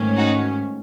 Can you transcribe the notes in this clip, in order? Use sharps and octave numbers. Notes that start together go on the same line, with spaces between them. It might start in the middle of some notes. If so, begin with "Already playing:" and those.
Already playing: G#2 D#3 A3 C#4
D#4 F#4